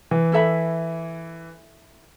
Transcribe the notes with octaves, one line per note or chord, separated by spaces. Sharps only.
E3
E4 A4 E5 B5